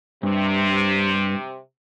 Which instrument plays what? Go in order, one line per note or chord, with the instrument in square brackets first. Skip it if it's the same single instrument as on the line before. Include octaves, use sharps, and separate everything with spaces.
[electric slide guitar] G2 [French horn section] C3